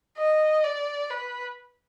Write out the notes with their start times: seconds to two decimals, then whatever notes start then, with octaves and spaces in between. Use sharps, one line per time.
0.18 D#5
0.64 D5
1.11 B4